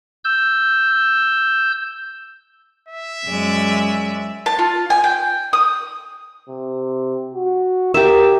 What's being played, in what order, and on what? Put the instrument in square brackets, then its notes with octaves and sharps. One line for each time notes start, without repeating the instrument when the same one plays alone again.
[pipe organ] E6 G6
[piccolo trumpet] E5
[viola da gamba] F#2 G#3 D5
[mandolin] A5
F4
G#5
G5
D#6
[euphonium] C3
F#4
[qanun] G4 E5 [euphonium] A#4